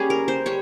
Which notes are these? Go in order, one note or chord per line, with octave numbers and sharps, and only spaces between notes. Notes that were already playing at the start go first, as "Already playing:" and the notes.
Already playing: G3 A#3 C#4 G#4
A#4
C5
G3 C#5